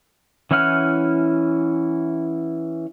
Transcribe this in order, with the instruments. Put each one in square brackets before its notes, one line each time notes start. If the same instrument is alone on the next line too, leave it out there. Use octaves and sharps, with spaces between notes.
[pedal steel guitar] E3 C#4 E4 F#5 F6